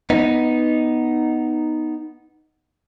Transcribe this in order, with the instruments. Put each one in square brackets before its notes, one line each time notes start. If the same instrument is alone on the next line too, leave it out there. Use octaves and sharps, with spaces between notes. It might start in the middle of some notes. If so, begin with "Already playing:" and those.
[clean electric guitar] B3 D#4